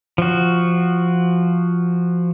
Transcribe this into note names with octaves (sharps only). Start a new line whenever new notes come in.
F3 F#4